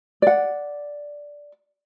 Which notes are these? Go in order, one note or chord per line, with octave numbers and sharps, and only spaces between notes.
D5 F#5